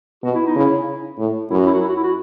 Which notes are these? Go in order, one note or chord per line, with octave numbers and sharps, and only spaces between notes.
B2 F#4
E4
D#4
C#3 E4
A2
F#2 E4
F#4
E4
F#4
E4
F#4
E4
F#4